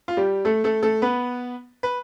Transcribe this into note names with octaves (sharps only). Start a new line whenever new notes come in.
F4
G3 G4
A3 A4
A3 A4
A3 A4
B3 B4
B4